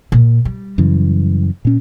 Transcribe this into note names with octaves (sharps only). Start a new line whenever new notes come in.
A#2
G3
F#2 C#3 E3
A#2 C#4